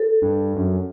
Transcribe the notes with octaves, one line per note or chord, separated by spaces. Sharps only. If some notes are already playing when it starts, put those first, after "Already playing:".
Already playing: A4
G2
F#2